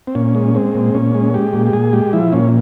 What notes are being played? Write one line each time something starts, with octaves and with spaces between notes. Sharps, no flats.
C4
A#2 C#4
G#3
G#3 C4
A#2
A#2 C#4
G#3
G#3 G4
A#2
G4
A#2 G#4
G#3 G4
F3 E4
A#2 C#4